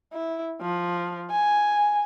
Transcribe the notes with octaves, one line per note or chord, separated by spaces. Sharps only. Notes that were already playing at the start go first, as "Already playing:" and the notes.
E4
F3
G#5